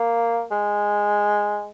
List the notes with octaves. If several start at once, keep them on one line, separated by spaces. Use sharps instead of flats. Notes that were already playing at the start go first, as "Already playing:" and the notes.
Already playing: A#3
G#3